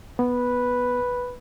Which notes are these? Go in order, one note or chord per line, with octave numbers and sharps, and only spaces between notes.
B3 B4